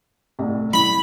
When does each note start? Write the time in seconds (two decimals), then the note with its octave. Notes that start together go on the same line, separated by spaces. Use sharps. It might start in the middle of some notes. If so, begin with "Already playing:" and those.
0.39 C2 A2
0.73 E4 B5